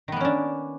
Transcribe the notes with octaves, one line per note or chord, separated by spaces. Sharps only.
D#3 A#3 B3 C#4 D4